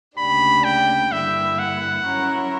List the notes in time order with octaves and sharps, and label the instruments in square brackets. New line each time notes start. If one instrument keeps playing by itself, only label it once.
[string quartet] D2 C#3 G3 A#3 D4 [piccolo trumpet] B5
[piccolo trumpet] G5
[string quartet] G2 D3 A#3 E4 [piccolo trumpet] E5
[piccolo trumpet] F#5
[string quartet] F#3 C#4 E4 A#4 C#5